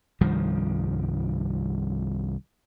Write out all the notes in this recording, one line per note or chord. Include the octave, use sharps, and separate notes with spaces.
C2 G2 D#3 F3